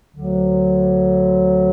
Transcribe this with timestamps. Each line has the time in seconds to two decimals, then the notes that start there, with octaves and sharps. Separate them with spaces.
0.14 D2 D3 F#3